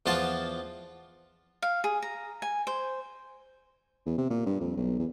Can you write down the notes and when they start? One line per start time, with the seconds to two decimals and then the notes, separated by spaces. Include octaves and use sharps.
0.06 E2 F3 F4 F#5 A5
1.62 F5
1.84 G#4
2.02 A#5
2.42 G#5
2.67 C5
4.06 E2
4.18 C3
4.30 A#2
4.46 G2
4.60 F2
4.77 B1
4.99 E2